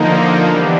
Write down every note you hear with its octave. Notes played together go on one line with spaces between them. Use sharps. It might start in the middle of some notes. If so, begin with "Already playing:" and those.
Already playing: D3 F3 A#3 D#4
E3 G3 B3 D4